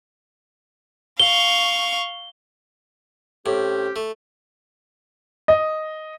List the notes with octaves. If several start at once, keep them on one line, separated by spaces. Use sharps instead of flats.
F5 C#6 G7
A2 C4 C#4 G4
A3
D#5